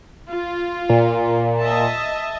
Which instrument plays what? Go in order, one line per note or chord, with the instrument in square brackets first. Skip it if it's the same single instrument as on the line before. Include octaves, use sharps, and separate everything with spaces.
[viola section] F4
[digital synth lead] A#2
[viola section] D#5 E5 A5